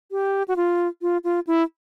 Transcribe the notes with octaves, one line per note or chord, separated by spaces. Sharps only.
G4
F#4
F4
F4
F4
E4